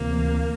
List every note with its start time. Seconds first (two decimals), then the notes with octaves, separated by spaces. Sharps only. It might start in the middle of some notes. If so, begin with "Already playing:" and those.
Already playing: D2 C3 E3 A#3